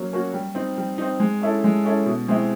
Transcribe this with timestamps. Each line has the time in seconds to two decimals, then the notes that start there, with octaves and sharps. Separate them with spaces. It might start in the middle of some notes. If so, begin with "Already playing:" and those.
Already playing: F#3 A#3 C#4
0.13 A#3 C#4 F#4
0.34 G3
0.55 C4 D#4
0.78 G3
0.98 C4 D#4
1.20 G#3
1.42 C#4 E4 A4
1.64 G#3
1.85 C#4 E4 A4
2.06 B2
2.28 G#3 C4 E4